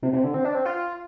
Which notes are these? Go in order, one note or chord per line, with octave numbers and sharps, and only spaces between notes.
C3
C3
D3
C4
D4
C4
F4